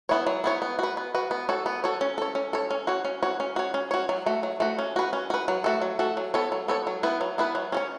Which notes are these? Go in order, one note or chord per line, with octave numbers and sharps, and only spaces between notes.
B3 E4 C#5
F#3
B3 E4 C#5
B3
F#4 B4
B3
F#4 B4
B3
F#4 A4 C#5
B3
F#4 A4 C#5
C#4
A4 C#5
C#4
A4 C#5
C#4
F#4 C#5
C#4
F#4 C#5
C#4
F#4 C#5
C#4
F#4 C#5
F#3
A3 F#4
F#3
A3 F#4
C#4
F#4 B4
C#4
F#4 B4
F#3
A3 F#4 A4
F#3
A3 F#4 A4
F#3
B3 A4 C#5
F#3
B3 A4 C#5
F#3
B3 E4 B4
F#3
B3 E4 B4
F#3
C#4 A4 C#5